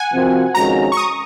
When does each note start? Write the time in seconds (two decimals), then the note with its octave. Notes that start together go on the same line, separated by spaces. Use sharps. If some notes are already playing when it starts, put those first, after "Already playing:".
Already playing: F#5 G#5
0.12 C3 F3 C4 F#4 A#4
0.54 F2 D#3 G#3 C#4 F#4 A#5
0.92 C#6
0.97 D#6